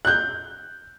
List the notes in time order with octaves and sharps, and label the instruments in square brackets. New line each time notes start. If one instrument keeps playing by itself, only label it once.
[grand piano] F#6 G6